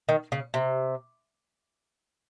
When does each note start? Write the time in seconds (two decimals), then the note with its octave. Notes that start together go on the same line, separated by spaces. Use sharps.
0.09 D#3
0.32 C#3
0.54 C3